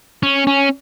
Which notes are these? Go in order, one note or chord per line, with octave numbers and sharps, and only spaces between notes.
C#4
C#4